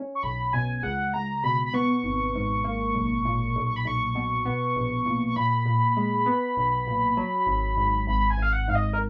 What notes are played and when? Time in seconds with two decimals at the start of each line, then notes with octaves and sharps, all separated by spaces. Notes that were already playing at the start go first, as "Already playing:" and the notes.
Already playing: C#4
0.15 C#6
0.23 B1 B5
0.53 B2 G#5
0.77 G#5
0.83 C#2 F#5
1.14 C#2 A#5
1.44 B2 B5
1.65 B5
1.74 B3 C#6
2.04 G#1
2.35 G#2
2.64 A#3
2.94 B1
3.25 A#2
3.55 B1
3.66 C#6
3.76 B5
3.85 B1 C#6
4.15 B2
4.45 B3
4.75 A#1
5.06 A#2
5.27 C#6
5.36 A#2 B5
5.66 A#2
5.97 G#3
6.26 B3
6.57 B1
6.87 A#2
7.17 F#3
7.46 G#1
7.77 G#2
8.07 G#1 B5
8.30 G#5
8.37 G#1 F5
8.53 F#5
8.67 G#2 F5
8.75 D#5
8.93 A#4